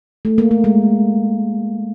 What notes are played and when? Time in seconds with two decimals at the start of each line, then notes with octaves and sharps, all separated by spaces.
0.25 A3
0.38 A#3
0.51 A3
0.64 G#3